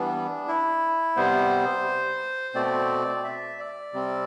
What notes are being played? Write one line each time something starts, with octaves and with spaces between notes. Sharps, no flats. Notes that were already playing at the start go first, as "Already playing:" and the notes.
Already playing: E3 G3 B3 D4
E4
C3 G3 B3 C5
B2 A3 C4 D5
E5
D5
C3 G3 C4